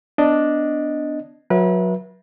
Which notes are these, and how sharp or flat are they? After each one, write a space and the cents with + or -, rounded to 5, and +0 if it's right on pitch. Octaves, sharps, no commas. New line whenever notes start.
B3 +20 D4 +0 D#5 +0
F#3 -20 B4 -35 E5 +0